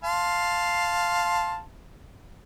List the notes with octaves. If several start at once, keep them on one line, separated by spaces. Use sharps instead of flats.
F5 A5 C6